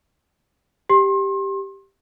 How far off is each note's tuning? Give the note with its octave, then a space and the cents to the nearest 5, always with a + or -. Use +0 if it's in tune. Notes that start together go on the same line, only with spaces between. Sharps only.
G4 +0 C6 +35